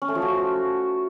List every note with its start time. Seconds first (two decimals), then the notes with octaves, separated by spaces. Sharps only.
0.02 C#4
0.08 A3
0.15 F3
0.22 F#4